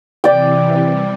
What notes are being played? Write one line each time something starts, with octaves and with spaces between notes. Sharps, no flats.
C3 E3 D5 G5
C3 G3